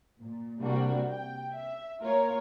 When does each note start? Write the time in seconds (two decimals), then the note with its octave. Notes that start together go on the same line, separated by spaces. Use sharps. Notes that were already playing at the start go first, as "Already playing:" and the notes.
0.20 A#2
0.60 C3 G3 A#3 D4 F#4
1.09 G5
1.51 E5
2.00 A#3 F4 A#4 C#5